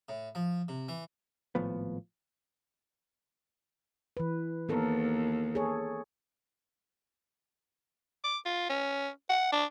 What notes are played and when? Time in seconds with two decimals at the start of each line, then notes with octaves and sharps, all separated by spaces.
0.09 A2
0.35 F3
0.68 C3
0.88 E3
1.55 G#1 A2 F3 B3
4.17 E3 B4
4.69 D#2 B3 A4 A#4
5.55 G#4 A4 C#5
8.24 D6
8.45 F4
8.69 C#4
9.29 F#5
9.52 D4